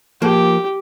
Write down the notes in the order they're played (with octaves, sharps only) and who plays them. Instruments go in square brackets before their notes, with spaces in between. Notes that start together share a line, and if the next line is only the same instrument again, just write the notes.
[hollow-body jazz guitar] F3 A#3 [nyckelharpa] G4